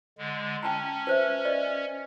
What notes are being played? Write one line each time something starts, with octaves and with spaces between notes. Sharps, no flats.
D3 G#3
C#4 G5 A5 A#5
B4 C5 E5
D5 D#5